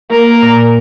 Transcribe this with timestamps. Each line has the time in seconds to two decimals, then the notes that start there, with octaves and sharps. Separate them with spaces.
0.10 A#3 A#4
0.42 A#2